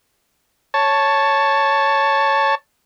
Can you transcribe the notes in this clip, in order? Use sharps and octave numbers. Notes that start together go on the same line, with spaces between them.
C#5 A5